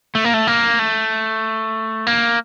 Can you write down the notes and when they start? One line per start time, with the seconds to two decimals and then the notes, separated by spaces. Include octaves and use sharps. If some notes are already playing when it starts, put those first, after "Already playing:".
0.15 A3
0.25 A#3
0.34 A3
0.47 A#3
0.79 A3
2.07 A#3